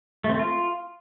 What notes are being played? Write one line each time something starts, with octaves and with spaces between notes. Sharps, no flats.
A3
C4
A3
F4